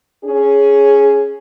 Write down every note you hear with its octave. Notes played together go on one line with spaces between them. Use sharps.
C#4 G#4